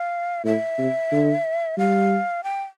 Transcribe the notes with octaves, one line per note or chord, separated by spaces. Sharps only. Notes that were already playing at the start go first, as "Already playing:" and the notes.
Already playing: F5
A2 E5
C3
D3
G3 F5
G5